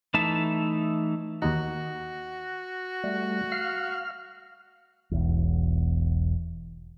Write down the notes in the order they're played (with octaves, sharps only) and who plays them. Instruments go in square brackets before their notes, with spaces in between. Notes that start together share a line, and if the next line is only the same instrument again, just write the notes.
[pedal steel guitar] E3 A3 D#4 E5 A5
[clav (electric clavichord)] D#2 D#4 [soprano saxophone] F#4
[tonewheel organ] G3 A3
F5 F6
[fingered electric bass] E1 B1 E2